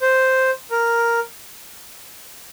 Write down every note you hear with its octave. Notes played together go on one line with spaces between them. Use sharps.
C5
A#4